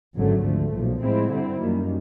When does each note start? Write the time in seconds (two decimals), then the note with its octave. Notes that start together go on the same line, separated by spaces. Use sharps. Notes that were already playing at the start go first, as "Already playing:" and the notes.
0.15 G#1 F#2 D3 F#3 A3
0.44 D2 D3 F3 A3
0.72 B1 A#2 F3
1.02 A2 F3 G#3 C4 E4
1.30 G2 D3 G3 C4 E4
1.59 F#2 D#3 G3 A#3